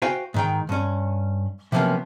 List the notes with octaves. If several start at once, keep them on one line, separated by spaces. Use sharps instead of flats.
F#4 C5 F5 G5 G#5
G#2 D#3 G5
G2 C#4
C3 F3 F#3 A#3 B3 C#4